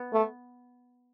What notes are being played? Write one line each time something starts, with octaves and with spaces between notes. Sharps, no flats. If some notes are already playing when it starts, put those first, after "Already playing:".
Already playing: B3
A3